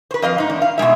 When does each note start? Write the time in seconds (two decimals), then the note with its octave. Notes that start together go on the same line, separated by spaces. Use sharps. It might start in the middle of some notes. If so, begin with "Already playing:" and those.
0.11 B4 C5
0.22 F2 D#5 F5
0.38 G#2 D#4
0.49 E2 D4
0.62 F5
0.78 B2 F3 G#3 E5